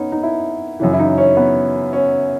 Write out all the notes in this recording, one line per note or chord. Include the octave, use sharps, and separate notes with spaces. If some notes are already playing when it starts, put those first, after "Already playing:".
Already playing: B3 C#4 D#4
D#4
E4
F#2 C#3 E3
E4
D#4
C#4
B3
C#4